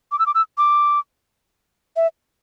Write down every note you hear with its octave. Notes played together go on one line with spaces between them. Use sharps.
D6
E6
D6
E6
D6
E5